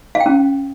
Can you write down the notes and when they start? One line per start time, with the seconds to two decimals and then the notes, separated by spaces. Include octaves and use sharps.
0.15 F5
0.20 G5
0.26 C#4